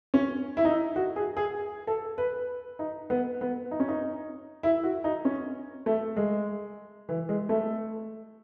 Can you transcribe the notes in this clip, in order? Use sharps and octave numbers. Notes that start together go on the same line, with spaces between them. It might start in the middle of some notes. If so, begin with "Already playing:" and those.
C#4
E4
D#4
F#4
G#4
G#4
A4
B4
D#4
B3
B3
D#4
C#4
D#4
E4
F#4
D#4
C#4
A3
G#3
E3
G#3
A3